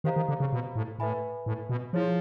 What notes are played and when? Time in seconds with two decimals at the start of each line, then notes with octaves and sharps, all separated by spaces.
0.04 D#3 G4 C5 F5 A#5
0.16 D#3
0.29 D3
0.40 C#3
0.53 B2
0.76 A2
0.99 A2 B4 E5 G#5 B5
1.46 A2
1.70 B2
1.93 F3 E4 G#4 C#5